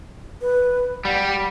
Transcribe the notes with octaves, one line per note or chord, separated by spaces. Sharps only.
B4
G3 F#5